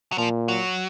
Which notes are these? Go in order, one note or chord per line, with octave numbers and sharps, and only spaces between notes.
F#3
A#2 F3
F#3